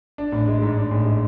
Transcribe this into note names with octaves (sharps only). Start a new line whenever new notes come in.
D4
A1
G#3
G#2
D4
A1
G#3